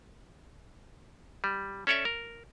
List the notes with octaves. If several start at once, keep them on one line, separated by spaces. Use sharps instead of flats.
G3
C#4 A4 C#5 D5 E5
A#4